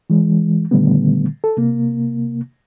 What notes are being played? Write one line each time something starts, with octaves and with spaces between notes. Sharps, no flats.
E3 G#3
A#2 D3 D#3 G3 A3 B3
A4
C3 A#3